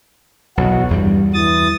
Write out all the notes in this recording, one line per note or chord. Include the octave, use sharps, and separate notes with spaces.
B1 E2 F#4
E2 G2 G3
E3 D#6 A6